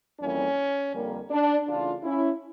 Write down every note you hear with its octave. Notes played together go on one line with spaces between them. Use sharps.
F2 E3 G3 A#3 C#4
F2 D3 G3 A#3
D4
C#3 E3 A3 D4 F4
C#4 E4